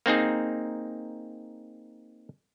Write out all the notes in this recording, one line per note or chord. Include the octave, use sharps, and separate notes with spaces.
A#3 C4 D#4 G#4